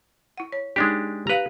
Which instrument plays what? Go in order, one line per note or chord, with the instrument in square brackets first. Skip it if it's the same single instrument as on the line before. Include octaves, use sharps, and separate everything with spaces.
[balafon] E4 F#5
C#5
[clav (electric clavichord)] G#3 D4 G4 [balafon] D#4
[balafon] G4 F5 [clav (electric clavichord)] B4 A#5